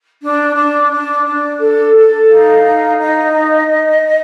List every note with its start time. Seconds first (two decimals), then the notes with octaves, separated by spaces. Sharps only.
0.21 D4
0.56 D4
0.91 D4
1.25 D4
1.59 A4
1.95 A4
2.29 D#4 F5
2.63 D#4
2.98 D#4 D#5
3.33 D#4